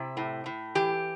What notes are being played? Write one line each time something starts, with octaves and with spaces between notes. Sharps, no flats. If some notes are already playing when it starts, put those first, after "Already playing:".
Already playing: C3 E4
A2
A2
E3 G4